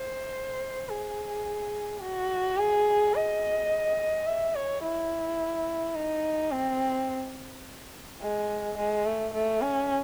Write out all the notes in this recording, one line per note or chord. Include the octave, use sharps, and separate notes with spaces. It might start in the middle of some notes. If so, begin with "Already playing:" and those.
Already playing: C5
G#4
F#4
G#4
D#5
E5
C#5
E4
D#4
C4
G#3
G#3
A3
A3
C#4